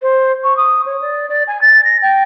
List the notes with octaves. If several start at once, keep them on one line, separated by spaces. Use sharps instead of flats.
C5
C#6
D#6
C#5
D5
D5
G#5
A6
A#6
G5